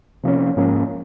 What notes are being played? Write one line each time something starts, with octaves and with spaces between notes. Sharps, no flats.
C3 F3 A#3 C#4
G#2 F3 A#3 C#4